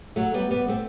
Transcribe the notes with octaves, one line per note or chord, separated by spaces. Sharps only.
F#3 A3
G3 B3
G3 B3
A3 C4